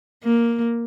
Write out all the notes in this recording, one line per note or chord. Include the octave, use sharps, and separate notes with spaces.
A#3